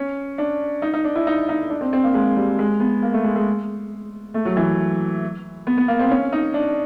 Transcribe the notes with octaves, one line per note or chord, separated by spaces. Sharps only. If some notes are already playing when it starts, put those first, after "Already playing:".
Already playing: C#4
D4
D#4
D#4
D4
E4
D#4
D#4
D4
C4
C4
A#3
G#3
G3
G#3
B3
A#3
A3
G#3
G#3
A3
F#3
E3
B3
B3
A#3
C4
C#4
D#4
D4